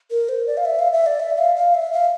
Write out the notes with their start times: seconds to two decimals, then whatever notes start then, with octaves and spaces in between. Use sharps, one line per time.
0.10 A#4
0.29 C5
0.47 D5
0.57 F5
0.65 E5
0.79 F5
0.92 E5
1.06 D5
1.20 E5
1.38 F5
1.56 F5
1.74 E5
1.93 F5